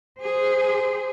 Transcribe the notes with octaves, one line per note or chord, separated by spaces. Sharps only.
G#4 C5